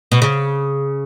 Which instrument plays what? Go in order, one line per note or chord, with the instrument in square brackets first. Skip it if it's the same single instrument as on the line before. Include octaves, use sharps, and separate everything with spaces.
[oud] B2
C#3